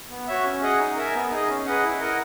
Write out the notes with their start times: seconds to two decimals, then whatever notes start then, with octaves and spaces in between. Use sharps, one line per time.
0.10 B3
0.27 F#4 C#5 E5
0.44 C#4
0.62 G#4 D#5 F#5
0.79 D#4
0.97 A#4 E5 G#5
1.14 B3
1.31 D#4 G#4 D#5
1.49 C#4
1.66 G#4 B4 D#5 F#5
1.84 E4
2.01 A#4 D#5 F#5